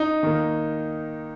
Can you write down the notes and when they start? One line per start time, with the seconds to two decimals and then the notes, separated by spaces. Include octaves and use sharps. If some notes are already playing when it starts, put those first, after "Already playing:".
Already playing: D#4
0.23 D#3 A#3